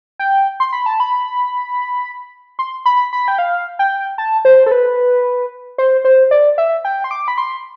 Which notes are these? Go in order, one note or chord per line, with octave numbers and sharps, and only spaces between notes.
G5
C6
B5
A5
B5
C6
B5
B5
G5
F5
G5
A5
C5
A4
B4
C5
C5
D5
E5
G5
C6
D6
B5
C6